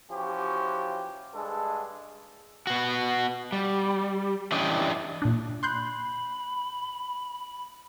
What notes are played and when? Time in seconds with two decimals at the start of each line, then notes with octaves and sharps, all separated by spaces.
0.11 E3 F3 C#4 F#4 G4
1.34 G2 G#3 D4 G#4 A4
2.67 B3 F#4
3.52 G3
4.52 E3 C#4 D4 G4 D5 D#5
5.22 A#2 D4
5.63 B5 C6 F#6 G6